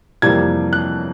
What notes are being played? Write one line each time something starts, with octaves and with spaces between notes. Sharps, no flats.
F2 C3 E3 G3 A#3 G#6
F#6